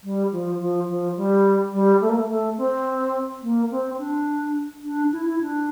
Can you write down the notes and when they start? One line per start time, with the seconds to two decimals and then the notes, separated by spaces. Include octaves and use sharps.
0.04 G3
0.32 F3
0.60 F3
0.88 F3
1.17 G3
1.73 G3
2.01 A3
2.09 A#3
2.17 A3
2.30 A3
2.58 C4
3.43 A#3
3.71 C4
3.99 D4
4.84 D4
5.12 E4
5.26 E4
5.41 D4